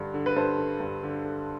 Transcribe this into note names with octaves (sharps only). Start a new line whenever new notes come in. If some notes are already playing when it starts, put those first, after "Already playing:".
Already playing: G2 D3
D3
B4
G2 A4 C5
D3
G2
D3
D3